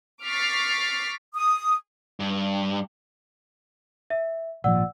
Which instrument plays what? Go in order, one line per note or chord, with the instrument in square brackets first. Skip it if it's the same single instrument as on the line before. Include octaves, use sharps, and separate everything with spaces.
[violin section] C#6 D6 F6 A6 B6 C7
[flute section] D#6
[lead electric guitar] G2
[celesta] E5
[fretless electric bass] G#1 A#2 F3 [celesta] D5 F#5 E6